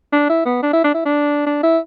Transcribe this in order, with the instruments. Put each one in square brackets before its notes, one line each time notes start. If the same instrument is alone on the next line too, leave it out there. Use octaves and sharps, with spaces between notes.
[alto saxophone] D4
E4
B3
D4
E4
D4
E4
D4
D4
E4